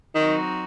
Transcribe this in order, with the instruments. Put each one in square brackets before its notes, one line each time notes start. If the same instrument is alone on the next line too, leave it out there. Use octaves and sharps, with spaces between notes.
[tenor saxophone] D#3 [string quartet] F#3 C4 D#4 F#4